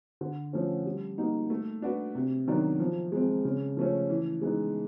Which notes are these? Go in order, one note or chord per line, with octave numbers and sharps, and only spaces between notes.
D3
F3 A3 C#4
G3
A#3 D#4 F#4
A3
D4 F#4 B4
C3
D#3 F#3 B3 D4
F3
G#3 C4
C#3
F3 A3 C#4
E3
G#3 B3 D#4